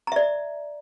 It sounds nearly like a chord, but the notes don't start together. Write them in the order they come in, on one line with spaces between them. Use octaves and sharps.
A#5 E5 D5